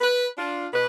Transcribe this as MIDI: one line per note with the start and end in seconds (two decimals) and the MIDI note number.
0.01 0.26 71
0.37 0.66 62
0.37 0.66 65
0.73 0.86 47
0.73 0.86 71